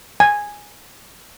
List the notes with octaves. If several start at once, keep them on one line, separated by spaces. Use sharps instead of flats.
G#5